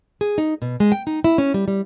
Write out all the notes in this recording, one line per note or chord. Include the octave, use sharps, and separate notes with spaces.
G#4
D#4
B2
G#3
G5
D#4
E4
C#4
G3
G3